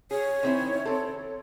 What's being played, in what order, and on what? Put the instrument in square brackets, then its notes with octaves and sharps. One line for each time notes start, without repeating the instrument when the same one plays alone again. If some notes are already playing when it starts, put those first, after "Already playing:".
[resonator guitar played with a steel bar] G#4 [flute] C#5
[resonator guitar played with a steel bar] D#3 C4 E4
C4 A4